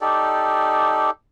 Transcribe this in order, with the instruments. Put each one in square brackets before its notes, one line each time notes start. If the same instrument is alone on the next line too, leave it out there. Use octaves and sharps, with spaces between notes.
[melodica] D#4 G4 A4 D5